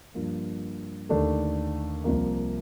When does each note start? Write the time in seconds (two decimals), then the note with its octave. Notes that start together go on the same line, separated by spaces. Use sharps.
0.14 G2 F3 A#3
1.09 D#2 D3 A3 D4 A4
2.04 C2 C3 F3 A#3